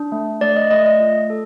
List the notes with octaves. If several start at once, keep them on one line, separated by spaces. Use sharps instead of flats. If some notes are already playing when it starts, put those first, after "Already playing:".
Already playing: D4
A3
A3 D5
D#5
A3 D#5
D#5
F4
A4